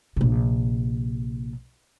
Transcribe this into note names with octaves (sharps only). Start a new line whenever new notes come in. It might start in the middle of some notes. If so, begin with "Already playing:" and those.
A#1 C3